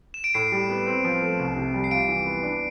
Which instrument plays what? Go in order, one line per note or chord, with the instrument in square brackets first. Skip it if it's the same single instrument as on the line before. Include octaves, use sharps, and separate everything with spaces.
[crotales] E7
D7
[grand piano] A2 [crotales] C7
[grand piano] G3
B3
C4
F3
A3
C2
C3
G3
[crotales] C7
[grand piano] F4 [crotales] D7
[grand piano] E3
B3
D4